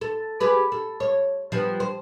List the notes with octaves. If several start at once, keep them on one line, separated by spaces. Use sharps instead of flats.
A4
G4 G#4 B4
A4
C#5
F3 G3 B3
C5